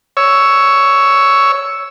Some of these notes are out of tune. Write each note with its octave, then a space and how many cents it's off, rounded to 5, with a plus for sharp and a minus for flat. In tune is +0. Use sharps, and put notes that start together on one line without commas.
C#5 +10 E6 +0